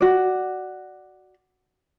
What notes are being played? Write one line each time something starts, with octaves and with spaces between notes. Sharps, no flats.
F#4 D5